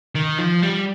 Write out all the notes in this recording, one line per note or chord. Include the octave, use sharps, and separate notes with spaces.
D#3
F3
G3